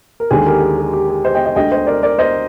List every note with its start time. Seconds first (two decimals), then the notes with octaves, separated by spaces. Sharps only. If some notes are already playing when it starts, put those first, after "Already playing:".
0.20 A#4
0.31 D#2 D3 G#3 G#4
0.46 G4 A#4
0.61 G#4
0.78 G#4
0.93 G4
1.09 G#4
1.25 C5 D#5
1.35 D#5 G5
1.45 D#5 G5
1.56 D2 D3 G#3 D#5 G5
1.72 C5 D#5
1.87 A#4 D5
2.03 A#4 D5
2.19 C5 D#5